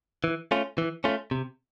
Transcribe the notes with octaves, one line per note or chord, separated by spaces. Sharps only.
E3
A3 C#4 F4
E3
A3 C#4 F4
C3